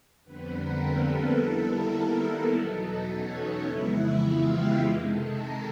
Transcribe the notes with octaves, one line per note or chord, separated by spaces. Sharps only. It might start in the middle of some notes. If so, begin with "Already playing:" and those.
F2 D3 G3 B3 C4 B4
A#3 A#4
A4
D#3 G3 B3 E4 A4
A#3 A#4
A4
A4
E2 B2 F#3 B3 D#4 A4
C#4 C#5
D#4 D#5
F2 C#3 E3 G#3 B3 E4 E5
F4 F5
G4 G5
C3 D#3 G#3
A4 A5
A#4 A#5